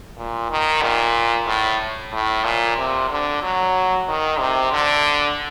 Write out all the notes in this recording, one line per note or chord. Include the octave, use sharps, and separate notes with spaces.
A#2
D#3
A#2
A2
A2
A#2
C3
D3
F#3
D#3
C3
D3